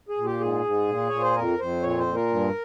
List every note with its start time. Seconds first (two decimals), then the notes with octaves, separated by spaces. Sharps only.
0.09 G#4
0.17 A#2
0.25 G4
0.40 G#2 G#4
0.64 G#2
0.88 A#2
1.09 A#2 C#5
1.22 C5
1.36 F2 A#4
1.59 F2 C5
1.83 A#2 C#5
1.99 C5
2.06 A#2
2.15 A#4
2.30 G2